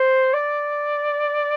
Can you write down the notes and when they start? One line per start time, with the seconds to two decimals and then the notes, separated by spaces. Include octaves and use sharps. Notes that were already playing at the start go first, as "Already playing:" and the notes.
Already playing: C5
0.34 D5